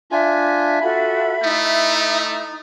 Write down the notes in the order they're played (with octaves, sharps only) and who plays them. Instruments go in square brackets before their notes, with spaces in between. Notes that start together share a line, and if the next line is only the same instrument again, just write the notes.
[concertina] D4 F4 G#5 [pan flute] E5
[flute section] F4 F#4 A4 [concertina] B5
[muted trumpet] A3 [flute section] D#4 E4 D#6